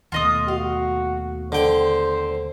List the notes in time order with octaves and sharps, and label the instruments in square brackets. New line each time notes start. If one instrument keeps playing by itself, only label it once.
[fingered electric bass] D#2 B2 A3 [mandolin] F4 D#5 D#6
[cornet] F#4 [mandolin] F5
[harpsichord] D3 G5 [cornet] C5